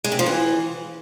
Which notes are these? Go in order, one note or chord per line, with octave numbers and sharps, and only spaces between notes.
G#3
C3
F3
E3